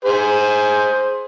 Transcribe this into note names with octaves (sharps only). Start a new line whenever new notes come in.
G#4 C5